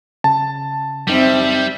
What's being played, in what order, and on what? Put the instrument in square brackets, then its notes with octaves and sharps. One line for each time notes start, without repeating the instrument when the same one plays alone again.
[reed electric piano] C#3 [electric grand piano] A5
[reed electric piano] F#2 D#4 [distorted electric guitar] G3 [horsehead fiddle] C4 E5